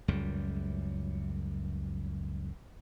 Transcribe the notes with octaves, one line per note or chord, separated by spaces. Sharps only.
C#2 F#2 G3